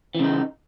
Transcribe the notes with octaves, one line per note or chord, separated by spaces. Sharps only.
C#3 E3 D#4